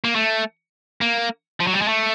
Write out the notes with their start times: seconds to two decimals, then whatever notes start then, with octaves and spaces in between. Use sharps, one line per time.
0.04 A#3
0.15 A3
1.01 A#3
1.60 F3
1.67 F#3
1.74 G3
1.82 G#3
1.88 A3